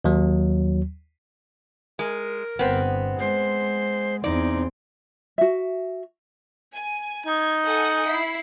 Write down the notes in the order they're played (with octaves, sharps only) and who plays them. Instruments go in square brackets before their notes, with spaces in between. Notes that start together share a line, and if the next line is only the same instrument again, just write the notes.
[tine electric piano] D#2 F#3
[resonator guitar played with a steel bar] G#3 [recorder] A#4
[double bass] G1 [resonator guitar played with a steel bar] B3 C4
[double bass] G#3 [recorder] C5
[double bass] E2 C4 [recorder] D#4 [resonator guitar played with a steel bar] D5
[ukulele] F#4 E5
[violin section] G#5
[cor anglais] D#4 [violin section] G#6
[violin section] A4 F#5 G#5
E4 C7